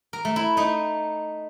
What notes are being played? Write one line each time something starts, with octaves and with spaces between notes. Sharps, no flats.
A#4
A3
E4
A3 D#4